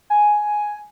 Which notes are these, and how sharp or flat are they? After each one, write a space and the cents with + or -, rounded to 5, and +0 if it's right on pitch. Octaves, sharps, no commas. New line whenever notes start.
G#5 +5